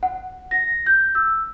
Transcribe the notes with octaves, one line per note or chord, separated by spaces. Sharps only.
F#5
A#6
G6
E6